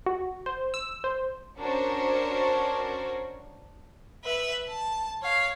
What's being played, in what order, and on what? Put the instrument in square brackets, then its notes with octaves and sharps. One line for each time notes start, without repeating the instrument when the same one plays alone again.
[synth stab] F#4
C5
E6
C5
[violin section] C#4 D4 F#4 A#4 C5 C#5
[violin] B4 E5
A5
C#5 F5